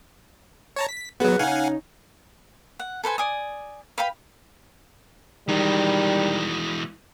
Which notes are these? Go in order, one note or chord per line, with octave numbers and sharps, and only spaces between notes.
C#5 A5 A#5
B6
F#3 B3 F#4 G#4 B4
C#3 C#4 D#4 F5 F#5 G#5
F#5
A4 B4 C5 G#5
D5 G#5 D#6
B4 F5 G5 B5
D#3 E3 G3 G#3